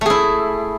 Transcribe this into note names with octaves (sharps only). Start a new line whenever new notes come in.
A3 E4 G#4